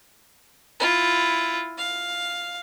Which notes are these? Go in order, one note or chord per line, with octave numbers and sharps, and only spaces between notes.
E4 F4
F5